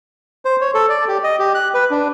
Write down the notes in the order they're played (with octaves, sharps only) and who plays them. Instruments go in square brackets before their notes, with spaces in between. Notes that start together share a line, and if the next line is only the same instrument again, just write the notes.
[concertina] C5
C#5
A4
D5
G4
D#5
G4
F#6
B4
D4